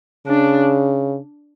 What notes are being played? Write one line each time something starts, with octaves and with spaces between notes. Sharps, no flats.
C#3 D4